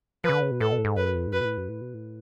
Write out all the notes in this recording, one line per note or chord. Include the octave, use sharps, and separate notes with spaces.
C#3 F3 B4
D3
C#3
B2
A2 A4
B2
A2
G#2
F#2 B4
F2
G#2
F#2 B4
B2
A2
F#2
A2
B2
A2